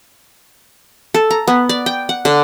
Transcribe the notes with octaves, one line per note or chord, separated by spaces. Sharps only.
A4
A#5
B3
D5
G5
F#5
D3